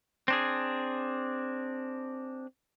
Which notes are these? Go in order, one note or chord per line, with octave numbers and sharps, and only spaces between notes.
C4 D4 G#4